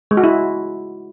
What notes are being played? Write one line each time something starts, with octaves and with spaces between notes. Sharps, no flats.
G#3
F#4
E4